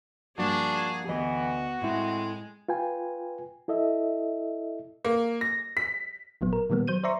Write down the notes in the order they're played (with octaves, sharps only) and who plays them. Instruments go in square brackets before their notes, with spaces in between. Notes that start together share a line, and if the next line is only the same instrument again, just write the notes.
[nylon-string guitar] G2 F3 A#3 [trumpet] D4 [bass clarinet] F#4 [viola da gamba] G#4
[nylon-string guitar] D2 D#5 [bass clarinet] E3 [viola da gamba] B3 [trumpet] F#4
[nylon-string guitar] A2 E4 [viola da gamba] G#3 [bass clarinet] C4
[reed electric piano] F4 B4 G5 G#5
E4 A4 D#5 E5
[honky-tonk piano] A#3
A#6
B6
[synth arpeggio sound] G#1 A#2 F#3 B3
A#4
A#2 D#3 G3 A#3 B3
F#3 C5 G6 D#7
C5 D5 E5 A#5 C6 C#6